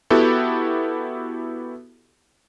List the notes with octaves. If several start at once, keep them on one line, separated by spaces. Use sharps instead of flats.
B3 E4 F#4 G4 A4